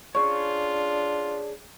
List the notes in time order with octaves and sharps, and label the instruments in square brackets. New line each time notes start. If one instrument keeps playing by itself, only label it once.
[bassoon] D4 [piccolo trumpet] F4 [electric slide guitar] G#4 C#5 [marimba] C#6